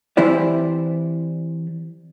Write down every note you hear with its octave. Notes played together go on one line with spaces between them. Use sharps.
E3 C4 E4 G4 C5 D5